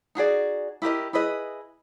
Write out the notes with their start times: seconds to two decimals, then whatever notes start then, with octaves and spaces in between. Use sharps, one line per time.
0.15 D#4 F#4 G#4 D5
0.82 E4 G4 A#4 D#5
1.13 E4 G#4 B4 D#5